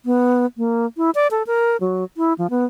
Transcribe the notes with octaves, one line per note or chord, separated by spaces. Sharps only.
B3
A#3
E4
D5
A4
A#4
F#3
E4
F3
B3